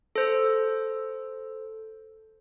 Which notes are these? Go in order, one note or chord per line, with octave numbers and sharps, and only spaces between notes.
A4 C5